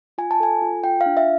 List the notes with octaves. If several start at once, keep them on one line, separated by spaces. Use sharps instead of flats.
F4 G#5
A5
A4 G#5
F4
F4 G5
F5
D4
E5